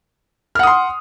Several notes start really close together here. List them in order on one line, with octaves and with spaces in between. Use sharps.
F6 F#5 D#6 C6